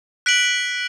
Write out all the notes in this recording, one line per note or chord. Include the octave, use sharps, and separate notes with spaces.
F#6 B6 D7 F#7